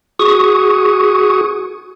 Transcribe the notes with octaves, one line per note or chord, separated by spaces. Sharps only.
F#4 G#4 C#6 D#6